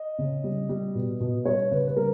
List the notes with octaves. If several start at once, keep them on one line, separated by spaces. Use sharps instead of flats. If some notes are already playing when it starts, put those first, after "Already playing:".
Already playing: D#5
C#3
G3
G3
B2
B2
G3 C#5
C#3 B4
B4
G3 A#4